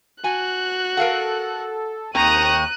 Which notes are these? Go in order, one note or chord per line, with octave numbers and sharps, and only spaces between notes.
F#4 G#5 F#6
A4 A#4 F5 F#5
D#2 C4 G5 A#5 C#6 D#6 F#6 D#7